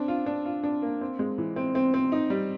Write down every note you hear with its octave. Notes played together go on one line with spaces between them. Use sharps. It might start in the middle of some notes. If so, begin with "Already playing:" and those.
Already playing: C4 D4
F4
D4
F4
D4
A#3
C4
G#3
E3
C4
C4
C4
D#4
G3